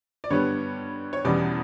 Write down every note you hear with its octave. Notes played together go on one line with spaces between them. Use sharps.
D5
G2 D3 G3 B3 C#5
C#5
E2 B2 G3 C#4 D5